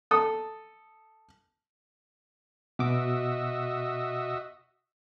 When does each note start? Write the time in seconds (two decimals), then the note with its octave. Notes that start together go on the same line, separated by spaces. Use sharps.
0.11 A4 D#6
2.79 B2 F#4 D#5 E5 D6